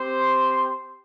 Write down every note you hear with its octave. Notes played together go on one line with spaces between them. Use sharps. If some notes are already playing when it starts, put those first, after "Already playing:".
Already playing: C4 G4 C5 C6